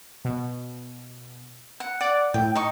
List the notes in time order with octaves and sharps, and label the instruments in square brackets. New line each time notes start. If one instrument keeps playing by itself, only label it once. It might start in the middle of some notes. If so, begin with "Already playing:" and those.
[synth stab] B2
[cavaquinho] F#5
[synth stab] D5 [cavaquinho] F#5
[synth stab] A2 [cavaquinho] G5
[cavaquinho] D#4 D#5 C#6